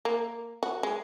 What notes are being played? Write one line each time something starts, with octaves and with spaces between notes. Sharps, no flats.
A#3
F#4
G#3